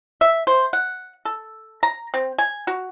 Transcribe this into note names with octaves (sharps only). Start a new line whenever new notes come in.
E5
C5
F#5
A4
A#5
C4
G#5
F#4